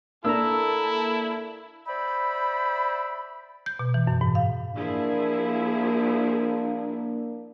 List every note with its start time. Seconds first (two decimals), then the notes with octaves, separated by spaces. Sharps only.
0.24 A#3 D4 E4 A4 A#5 E6
1.87 C5 D5 E5 G5 B5
3.66 G6
3.79 B2
3.94 E3
4.07 F#2
4.21 G#2
4.35 F5
4.76 F3 A#3 D4 E4 G#4